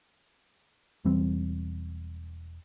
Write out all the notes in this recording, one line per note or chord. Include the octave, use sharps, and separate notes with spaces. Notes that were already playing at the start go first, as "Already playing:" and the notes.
E1 E3 G3 C4